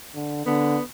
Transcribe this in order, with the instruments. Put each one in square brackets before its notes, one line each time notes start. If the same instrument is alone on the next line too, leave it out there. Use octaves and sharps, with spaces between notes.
[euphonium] D3
[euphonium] D3 [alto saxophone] B3